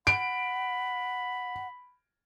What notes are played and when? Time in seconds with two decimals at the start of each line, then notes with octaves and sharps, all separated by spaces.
0.07 F#5 B5 D7